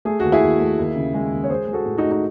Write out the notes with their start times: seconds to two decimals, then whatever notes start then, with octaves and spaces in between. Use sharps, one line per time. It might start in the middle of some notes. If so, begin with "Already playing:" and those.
0.05 A3 G#4
0.20 D#2 F#4
0.32 E4 G#4
0.42 D#2
0.60 A3
0.78 D#2
0.96 C#3
1.14 G#3
1.32 D#2
1.44 C#5
1.50 G#3 G#4 C5
1.68 G#3
1.73 F#4 A4
1.86 A2
1.97 D#4 F#4
2.04 A2
2.11 D#4